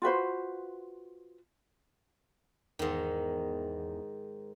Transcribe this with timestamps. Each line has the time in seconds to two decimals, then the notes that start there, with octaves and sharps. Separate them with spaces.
0.02 F4 F#4 B4 C5
2.79 E2 G#2 D#3